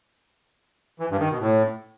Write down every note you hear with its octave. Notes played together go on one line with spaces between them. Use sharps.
E3
G2
D#3
B2
A2